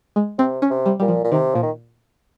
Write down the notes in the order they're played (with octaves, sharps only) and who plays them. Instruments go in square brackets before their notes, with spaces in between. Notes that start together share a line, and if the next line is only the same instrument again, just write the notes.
[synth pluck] G#3
[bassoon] C3 [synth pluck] C4
[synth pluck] C#4
[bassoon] C3
[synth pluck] G3
[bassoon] A#2 [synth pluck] G3
[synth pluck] F3
[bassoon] A#2
[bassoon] C3 [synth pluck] D#3
[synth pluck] A#2 [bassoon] F3
[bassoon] D#3